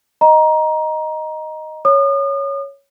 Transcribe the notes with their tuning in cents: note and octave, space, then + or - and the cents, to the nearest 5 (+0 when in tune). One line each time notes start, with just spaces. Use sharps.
D#5 +0 A#5 +20
C#5 +5 D#6 -40